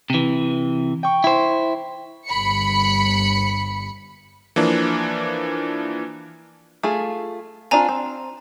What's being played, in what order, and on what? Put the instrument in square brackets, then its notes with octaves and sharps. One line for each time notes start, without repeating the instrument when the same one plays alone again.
[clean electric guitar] C3 E3
[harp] G5 C#6
[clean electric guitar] E4 C5
[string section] G1 B5 C#7
[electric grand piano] E3 F3 A#3 D4
[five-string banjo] A3 F4 G#4
[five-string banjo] C4 D4 F4 [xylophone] G#5 A#5
[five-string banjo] C4